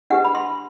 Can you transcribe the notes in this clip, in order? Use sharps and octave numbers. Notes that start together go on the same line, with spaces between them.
D4 G4 B4 F#5
B5
C6